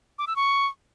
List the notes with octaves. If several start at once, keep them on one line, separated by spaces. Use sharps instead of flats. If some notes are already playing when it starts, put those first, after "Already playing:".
D6
E6
C#6